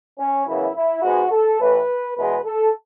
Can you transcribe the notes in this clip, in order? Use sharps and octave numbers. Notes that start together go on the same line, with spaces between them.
C#4
F#2 C#3 E3 B3 E4
E4
G#2 G#3 B3 F#4
A4
A1 A2 E3 B4
E2 B2 G#3 B3 B4
A4